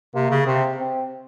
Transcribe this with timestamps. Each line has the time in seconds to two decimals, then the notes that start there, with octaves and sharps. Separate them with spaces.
0.14 C3 A#3
0.30 C#3
0.46 C3 C4
0.79 C4